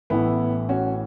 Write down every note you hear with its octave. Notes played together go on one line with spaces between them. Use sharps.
A1 A2 E3 B3 E4
C#4 F#4